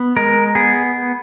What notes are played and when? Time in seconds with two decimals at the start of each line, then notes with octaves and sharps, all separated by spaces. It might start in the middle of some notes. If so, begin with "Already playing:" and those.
Already playing: B3
0.16 G#3 A#4
0.55 B3 G#4